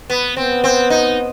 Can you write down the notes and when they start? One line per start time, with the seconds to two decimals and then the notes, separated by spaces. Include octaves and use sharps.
0.10 B3
0.36 B3 C4
0.64 C4
0.90 D#4